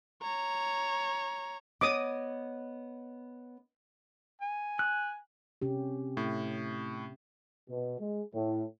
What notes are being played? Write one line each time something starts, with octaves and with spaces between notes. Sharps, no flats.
C#5 A#5
B3 C#5 D#5 D6 D#6
G#5
F#6
C3 C#4 G4
A2
B2
G#3
A2